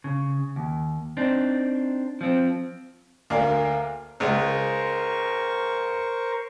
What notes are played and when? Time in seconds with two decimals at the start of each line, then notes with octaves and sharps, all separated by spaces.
0.04 C#3
0.56 D#2
1.17 C4 D4 D#4
2.21 F3 C4
3.30 D2 A#3 A#4 D5 F5
4.20 C#2 G#3 A#4 C5 C#6